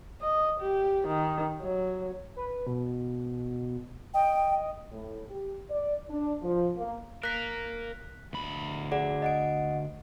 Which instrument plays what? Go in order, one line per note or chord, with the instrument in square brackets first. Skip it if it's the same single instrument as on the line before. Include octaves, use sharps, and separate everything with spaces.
[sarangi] D#5
G4
D#3
F#3
[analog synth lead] B4
B2
[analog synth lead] D#5 [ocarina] G5
[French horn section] A2
G4
D5
D4
F3
A#3
[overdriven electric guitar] A#4 F5 [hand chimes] F#6 B6
[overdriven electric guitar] D2 B5
[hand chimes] G#4 D5 F#5
D#5 F#5 D7